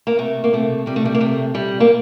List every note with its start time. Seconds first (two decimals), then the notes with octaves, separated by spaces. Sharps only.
0.07 A#3
0.18 C3 A3
0.44 A#3
0.53 C3 A3
0.86 C3 G3
0.96 A3
1.05 G3
1.15 A#3
1.20 C3 A3
1.54 C3 G3
1.80 A#3